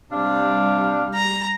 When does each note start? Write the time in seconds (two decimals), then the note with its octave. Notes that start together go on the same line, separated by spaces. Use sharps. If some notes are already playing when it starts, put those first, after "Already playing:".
0.12 C3 G3 D4 F5
1.14 A#5